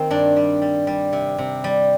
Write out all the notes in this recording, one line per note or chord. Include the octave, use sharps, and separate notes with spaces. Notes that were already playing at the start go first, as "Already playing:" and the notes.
Already playing: D#3 A#3 C4
G2 D4
G3
G3
G3
C3
C3
G3